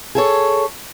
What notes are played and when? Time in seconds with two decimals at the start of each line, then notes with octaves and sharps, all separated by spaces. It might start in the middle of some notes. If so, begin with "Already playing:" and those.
0.15 G#4 A4 C#5